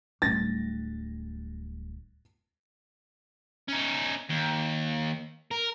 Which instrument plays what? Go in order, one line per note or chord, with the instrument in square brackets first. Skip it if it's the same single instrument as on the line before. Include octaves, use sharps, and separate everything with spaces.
[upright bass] D1 G3 [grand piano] A6 A#6
[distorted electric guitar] C#4 D#4
D#2
A#4